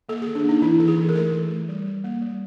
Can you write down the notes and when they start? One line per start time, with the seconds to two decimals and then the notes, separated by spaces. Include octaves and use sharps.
0.09 A#3 A4
0.22 G#4
0.26 D#3
0.35 D4
0.44 A#3 D#4
0.62 E3 E4
0.79 E3 A4
0.88 G#4
0.98 E3
1.09 A#4
1.15 A3 A4
1.33 E3
1.51 A3
1.69 G3
1.86 G3
2.04 A#3
2.22 G3